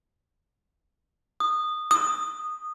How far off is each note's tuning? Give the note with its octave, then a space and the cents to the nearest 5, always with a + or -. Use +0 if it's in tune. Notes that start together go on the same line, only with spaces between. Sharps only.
D#6 -15
D#6 -10